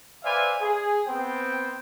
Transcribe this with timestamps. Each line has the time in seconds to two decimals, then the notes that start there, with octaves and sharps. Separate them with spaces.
0.24 B4 C5 D5 E5 F5 G#5
0.62 G#4
1.07 B3 C4 C5 G5